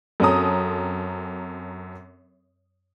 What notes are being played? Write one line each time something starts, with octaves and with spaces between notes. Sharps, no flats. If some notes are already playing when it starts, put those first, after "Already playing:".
F#2 C4 C#4 A4 A#5 D#6